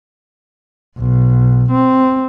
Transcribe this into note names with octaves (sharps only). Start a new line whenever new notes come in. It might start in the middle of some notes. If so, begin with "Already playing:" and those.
B1
C4